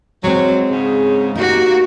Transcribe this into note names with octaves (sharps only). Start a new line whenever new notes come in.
F#3 G#3 C4
G#2 C#3
A#3 D#4 F#4 G4